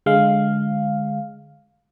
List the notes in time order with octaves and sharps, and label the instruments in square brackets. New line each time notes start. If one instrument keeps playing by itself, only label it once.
[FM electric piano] D3 G#3 F5